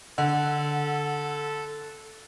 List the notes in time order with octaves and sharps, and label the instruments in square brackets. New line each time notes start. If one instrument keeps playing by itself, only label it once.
[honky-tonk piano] D3 [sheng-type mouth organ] A4 [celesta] F#5